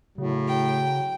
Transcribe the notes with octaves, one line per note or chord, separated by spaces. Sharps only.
A2 C#3 F#3
G5